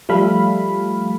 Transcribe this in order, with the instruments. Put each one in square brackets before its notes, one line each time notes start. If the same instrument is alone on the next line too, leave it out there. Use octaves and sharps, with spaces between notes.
[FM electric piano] F3 G3 A3 A4 F5 B5